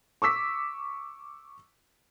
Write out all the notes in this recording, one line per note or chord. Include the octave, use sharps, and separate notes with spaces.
C#6 D6 E6 B6